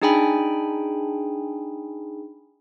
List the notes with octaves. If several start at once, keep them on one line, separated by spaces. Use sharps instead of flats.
D4 D#4 G#4 G5 G#5 B5